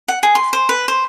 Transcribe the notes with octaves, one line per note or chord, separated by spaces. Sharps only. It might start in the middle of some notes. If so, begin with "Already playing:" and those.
F#5
G#4
C6
C5
B4
C5